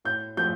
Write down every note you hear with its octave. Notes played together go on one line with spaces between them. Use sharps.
A2 G6
F3 A3 G6